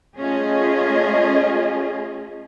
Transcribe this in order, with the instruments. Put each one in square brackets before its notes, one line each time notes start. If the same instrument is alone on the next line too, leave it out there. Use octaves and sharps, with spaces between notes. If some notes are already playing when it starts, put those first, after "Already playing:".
[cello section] A3 C#4 F4 G#4 D#5